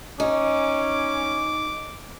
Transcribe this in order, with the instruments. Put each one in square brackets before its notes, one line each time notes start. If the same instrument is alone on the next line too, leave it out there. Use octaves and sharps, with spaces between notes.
[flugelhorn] C#4 [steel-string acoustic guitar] D#4 [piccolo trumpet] D6